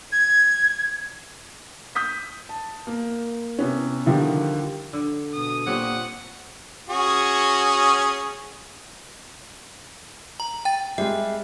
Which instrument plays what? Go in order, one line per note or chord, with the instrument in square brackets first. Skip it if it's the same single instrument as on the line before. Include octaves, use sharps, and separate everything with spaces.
[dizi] G#6
[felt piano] D#6 G6 B6
A5
A#3
C3 B3 C#4
D3 D#3 F3 G3
[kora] D3
[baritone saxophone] B2 [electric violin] D#6
[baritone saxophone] A#2 [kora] C4 G4 C#5 [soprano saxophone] F#5
[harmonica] C#4 F#4 G#4
[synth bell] A#5
G5 A6
[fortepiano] G3 G#3 [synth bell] E5